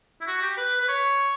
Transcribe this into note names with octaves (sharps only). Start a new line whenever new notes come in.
E4
F#4
G4
B4
B4
C#5